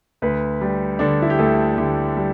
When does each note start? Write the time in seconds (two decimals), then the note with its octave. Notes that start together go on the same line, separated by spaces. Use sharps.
0.22 D2 B4
0.61 G3
0.99 D3 D4
1.22 E4
1.30 G4
1.39 D2 A4
1.77 D2 G4
2.17 G3